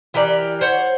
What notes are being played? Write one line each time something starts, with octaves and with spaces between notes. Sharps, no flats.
E3 G4 A#4 D5
C5 C#5 F#5